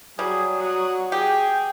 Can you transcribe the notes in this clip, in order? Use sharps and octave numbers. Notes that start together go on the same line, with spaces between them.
F#3 G3 G#4
F#4 F#5 D#6
G4 G#4 G5